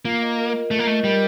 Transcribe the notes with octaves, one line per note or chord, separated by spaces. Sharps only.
A#3 F4
D#5
A#4
F4
A3 F4
A#3
A3 D#5
G3 A#4